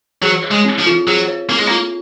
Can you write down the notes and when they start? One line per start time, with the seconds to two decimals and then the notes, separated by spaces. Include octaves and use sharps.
0.23 F#3 G#4
0.44 C#5
0.51 G#3
0.65 C4
0.79 F3
0.86 F4
1.07 F#3 G#4
1.28 C#5
1.49 A#3 C4
1.59 G#3
1.67 A#3
1.71 F4